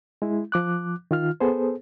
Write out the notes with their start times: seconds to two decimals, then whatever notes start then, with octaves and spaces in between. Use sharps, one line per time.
0.22 G#3 E4
0.52 F3 D6 F#6
1.11 D#3 F4 F6
1.40 B3 G#4 A4 C5